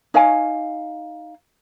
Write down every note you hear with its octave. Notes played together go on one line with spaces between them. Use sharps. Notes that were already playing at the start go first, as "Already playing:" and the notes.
D#4 C#5 F5 G#5